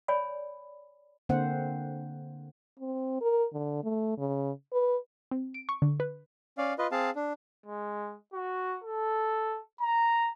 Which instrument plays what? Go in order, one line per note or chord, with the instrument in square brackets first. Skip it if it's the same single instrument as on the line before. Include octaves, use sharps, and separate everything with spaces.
[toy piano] C#5 D5 G#5 B5
[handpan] D3 A#3 C4 C5 F#5
[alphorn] C4
A#4
D3
A3
C#3
B4
[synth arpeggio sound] C4
D7
C#6
D3
B4
[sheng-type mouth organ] C#4 D5 F5
F4 B4 D#5
C4 G#4 F5 A5
D4
[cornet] G#3
F#4
A4
A#5